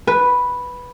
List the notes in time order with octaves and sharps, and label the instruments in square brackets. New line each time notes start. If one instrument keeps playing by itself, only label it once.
[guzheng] B4